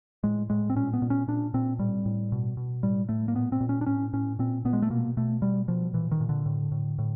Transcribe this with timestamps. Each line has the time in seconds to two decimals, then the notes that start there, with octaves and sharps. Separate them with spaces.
0.24 A2 G#3
0.50 A2 G#3
0.70 C4
0.76 A#2 C#4
0.93 B3
1.02 A#2
1.10 C#4
1.28 A#2 D4
1.54 A#2 C4
1.79 A2 G3
2.06 A2
2.32 B2
2.57 B2
2.83 A2 G3
3.09 A2 A3
3.28 A#3
3.35 A#2 B3
3.52 C4
3.61 A#2
3.69 C#4
3.81 D4
3.86 A2 C#4
4.13 A2 C#4
4.39 A#2 C4
4.65 A#2 B3
4.73 G#3
4.82 A3
4.90 B2 A#3
5.17 B2 A3
5.42 B2 G3
5.68 B2 F3
5.94 A#2 E3
6.11 D#3
6.20 A#2
6.29 D3
6.46 A2
6.72 A2
6.99 A2